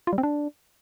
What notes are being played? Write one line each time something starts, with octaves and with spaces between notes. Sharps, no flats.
F4
G3
C4
D4